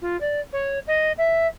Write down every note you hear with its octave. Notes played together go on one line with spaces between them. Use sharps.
F4
D5
C#5
D#5
E5